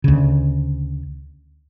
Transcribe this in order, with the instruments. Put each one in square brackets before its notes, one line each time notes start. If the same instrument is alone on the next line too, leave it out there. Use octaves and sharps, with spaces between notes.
[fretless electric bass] D2 C#3